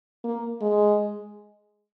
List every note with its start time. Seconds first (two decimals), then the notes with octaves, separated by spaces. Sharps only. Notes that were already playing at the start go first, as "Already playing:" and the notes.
0.24 A#3
0.61 G#3